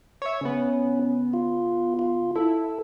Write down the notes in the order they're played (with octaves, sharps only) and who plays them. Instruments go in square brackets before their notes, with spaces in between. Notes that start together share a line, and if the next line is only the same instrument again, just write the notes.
[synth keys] C#5 E5
[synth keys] C#3 B3 [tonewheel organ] C#4
[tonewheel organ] F4
F4
[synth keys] E4 [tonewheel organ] A4